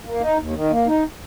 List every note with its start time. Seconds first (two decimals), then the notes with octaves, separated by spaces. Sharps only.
0.05 A#3
0.21 D#4
0.37 D#2
0.55 D#3
0.70 A#3
0.87 D#4